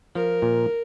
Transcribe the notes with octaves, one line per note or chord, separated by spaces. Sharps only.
F3 A#4
A#2